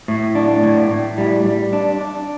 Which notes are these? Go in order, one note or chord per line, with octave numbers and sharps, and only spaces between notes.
A2
D4
A2
A2
G3
G3
D4
D4